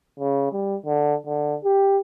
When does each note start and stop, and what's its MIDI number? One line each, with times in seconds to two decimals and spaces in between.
0.19 0.48 49
0.52 0.76 55
0.86 1.15 50
1.27 1.55 50
1.64 1.99 67